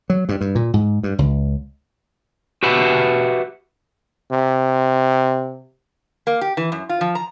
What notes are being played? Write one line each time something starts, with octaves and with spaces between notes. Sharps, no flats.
F#3
G2
G2
A#2
G#2
G2
C#2
F#4 G4 B4 E5 F#5 B5
C3
A#3
G4
E3
F#2
F4
F3
A#5